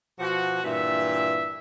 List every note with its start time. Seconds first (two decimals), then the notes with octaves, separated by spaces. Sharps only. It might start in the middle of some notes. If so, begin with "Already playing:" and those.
0.19 B2 F3 F#4
0.64 G2 A#2 E3 E5